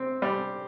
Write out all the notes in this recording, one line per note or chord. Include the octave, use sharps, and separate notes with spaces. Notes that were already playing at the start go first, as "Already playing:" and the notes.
Already playing: C4
G3